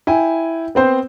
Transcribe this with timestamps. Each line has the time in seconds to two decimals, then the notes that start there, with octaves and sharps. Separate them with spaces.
0.07 E4 G5 G#5
0.75 B3 C4 C5